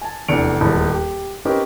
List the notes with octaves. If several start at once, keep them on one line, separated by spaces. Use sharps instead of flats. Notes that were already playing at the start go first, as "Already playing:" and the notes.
G#5 A5
F1 E2 D4 C#7 D7 F7
D#1 E2 G#3 A5 B5
G4
C4 C#4 D#4 G4 A#4 B4